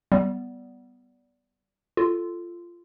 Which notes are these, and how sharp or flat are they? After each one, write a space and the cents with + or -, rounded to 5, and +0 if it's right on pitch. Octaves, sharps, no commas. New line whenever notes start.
G3 -20 B3 +0
F4 -15 A4 +0